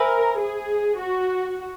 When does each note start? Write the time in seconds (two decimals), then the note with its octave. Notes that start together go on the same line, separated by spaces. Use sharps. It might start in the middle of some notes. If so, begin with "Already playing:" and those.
Already playing: A#4 C5 E5 G#5 B5 E6
0.39 G#4
0.99 F#4